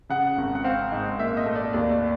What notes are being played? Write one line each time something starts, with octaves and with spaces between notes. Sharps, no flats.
C#3 F#5
G#1
F#5
C4 F5
G#2
A#2 E5
D#5
A3
D5
D#2 D5
D5